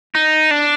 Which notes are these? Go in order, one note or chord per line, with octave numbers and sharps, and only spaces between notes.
D#4
D4